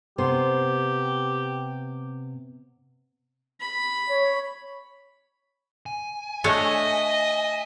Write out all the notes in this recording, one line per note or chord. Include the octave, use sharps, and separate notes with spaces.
C3 B3 G4 C5
B5
C#5
G#5
A3 D4 C#5 D#5 E5